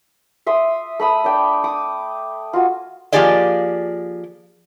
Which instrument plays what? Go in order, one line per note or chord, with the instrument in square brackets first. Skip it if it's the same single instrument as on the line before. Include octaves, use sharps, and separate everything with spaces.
[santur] E5 C6 D#6
A3 B5 D#6 E6
D4 G5
D6 D#6
F4 F#4 G#5
[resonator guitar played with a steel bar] F3 A#3 G4 G#4 D5 D#5